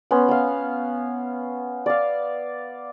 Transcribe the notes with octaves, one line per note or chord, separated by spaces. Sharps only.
B3 C#4 C6
B3 F5
D5 F5